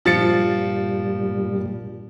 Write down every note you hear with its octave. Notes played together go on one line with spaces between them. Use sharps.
G2 A#2 F3 G3 A6 C#7